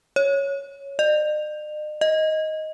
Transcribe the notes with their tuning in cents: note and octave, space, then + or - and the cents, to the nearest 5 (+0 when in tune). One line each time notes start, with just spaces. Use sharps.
C#5 +0
D#5 -45
D#5 +10